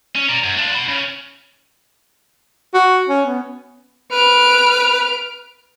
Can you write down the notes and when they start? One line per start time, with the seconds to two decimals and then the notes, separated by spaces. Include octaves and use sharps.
0.16 C#4
0.29 A#4 D5
0.43 F#2
0.57 D4 F4
0.72 F#4 B5
0.89 C#3
2.74 F#4
3.09 C#4
3.26 B3
4.12 B4 F6 D7